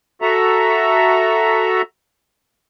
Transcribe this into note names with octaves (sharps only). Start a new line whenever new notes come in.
F#4 A4 E5 A#5